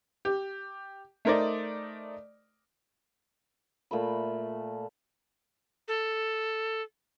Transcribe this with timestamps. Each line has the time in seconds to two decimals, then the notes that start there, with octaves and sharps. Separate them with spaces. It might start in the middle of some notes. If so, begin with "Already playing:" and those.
0.25 G4
1.25 A3 D#4 A#4 C5 D5 D#5
3.91 A#2 A3 B5
5.88 A4